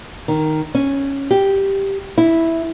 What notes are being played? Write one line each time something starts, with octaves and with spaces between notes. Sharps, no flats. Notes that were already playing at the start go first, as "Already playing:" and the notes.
D#3
C#4
G4
E4